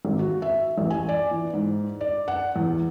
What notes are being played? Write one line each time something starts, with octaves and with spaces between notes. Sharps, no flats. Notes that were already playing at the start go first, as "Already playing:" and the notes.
G#1
F#4
E5
A1
G#5
D5
E3
G#2
D5
F#5
E2